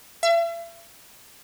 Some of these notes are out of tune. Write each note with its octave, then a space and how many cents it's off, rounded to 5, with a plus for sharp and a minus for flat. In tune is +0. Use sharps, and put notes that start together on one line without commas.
E5 +40